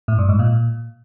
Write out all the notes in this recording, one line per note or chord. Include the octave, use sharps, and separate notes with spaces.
A2
G2
G#2
A#2